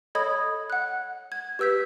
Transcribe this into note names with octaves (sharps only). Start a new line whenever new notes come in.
A4 C#5 D#5 B5 D#6 G#6
F#5 F#6
G#6
G4 B4 E6 G6 B6